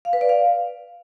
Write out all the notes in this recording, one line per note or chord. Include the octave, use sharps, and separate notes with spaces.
F5
B4
D5
F5